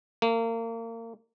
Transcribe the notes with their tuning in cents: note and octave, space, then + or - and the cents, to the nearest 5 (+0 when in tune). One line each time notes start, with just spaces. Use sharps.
A#3 -30